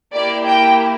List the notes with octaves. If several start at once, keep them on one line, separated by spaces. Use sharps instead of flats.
A#3 E4 G4 D5
G5